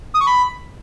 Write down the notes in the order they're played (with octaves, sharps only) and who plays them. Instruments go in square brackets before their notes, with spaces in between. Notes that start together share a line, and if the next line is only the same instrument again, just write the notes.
[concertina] D#6
C#6
B5